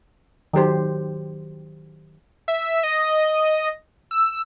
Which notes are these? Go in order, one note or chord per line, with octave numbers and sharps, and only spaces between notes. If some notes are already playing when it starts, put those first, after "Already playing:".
D#3 F#3 G4 C5
E5
D#5
E6